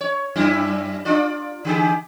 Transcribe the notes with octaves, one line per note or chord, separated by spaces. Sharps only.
C#5
F#2 G3 E4
D4 F4 D5
D3 G4 G#4